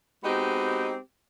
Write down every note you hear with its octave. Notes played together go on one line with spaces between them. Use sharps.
G#3 B3 C4 D#4 F#4 G4